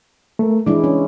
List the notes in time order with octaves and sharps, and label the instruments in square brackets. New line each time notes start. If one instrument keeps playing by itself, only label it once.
[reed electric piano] A3 A#4
[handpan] E3 G#3 E4 [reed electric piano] D4 D6
[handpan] C#4